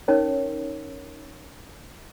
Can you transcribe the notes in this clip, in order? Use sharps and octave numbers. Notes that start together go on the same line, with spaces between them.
C#4 D#4 A#4 C#5